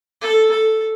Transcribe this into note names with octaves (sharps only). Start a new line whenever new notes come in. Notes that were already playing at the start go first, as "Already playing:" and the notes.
A4
A4